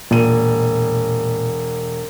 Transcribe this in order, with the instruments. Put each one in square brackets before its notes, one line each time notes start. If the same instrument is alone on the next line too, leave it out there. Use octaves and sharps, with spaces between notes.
[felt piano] E1 D#7 [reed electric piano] A#2